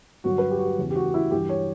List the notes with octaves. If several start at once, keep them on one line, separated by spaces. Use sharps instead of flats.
G2 D3 F#3 F#4
B4
G4
F#4
G4
E2 C#3 E3
G4
F#4
E4
G2 E3 G4
C#5